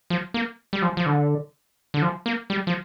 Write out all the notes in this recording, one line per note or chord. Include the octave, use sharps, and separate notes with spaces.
F3
A#3
G3
F3
F3
D3
D3
F3
A#3
G3
F3